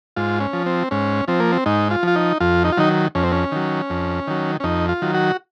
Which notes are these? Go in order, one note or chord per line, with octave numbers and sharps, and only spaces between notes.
G#2 F4
C#4
F3
C4
G#2 C#4
F3 C4
A#3
C4
G#2 D#4
F4
F3 F4
D#4
F2 F4
D#4
F4
D#3 F#3 D#4
F2 C#4
C4
C#4
D#3 F#3
F2
D#3 F#3
C#4
F2 D#4
F4
D#3 F#3
F#4